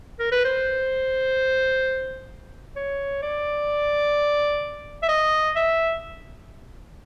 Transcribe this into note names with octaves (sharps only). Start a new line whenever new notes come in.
A#4
B4
C5
C#5
D5
E5
D#5
E5